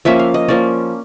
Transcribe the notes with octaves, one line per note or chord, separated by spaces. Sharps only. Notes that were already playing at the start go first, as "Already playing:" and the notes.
F3 A#3 C#4 E5
F5
D#5
F3 A#3 C#4 D5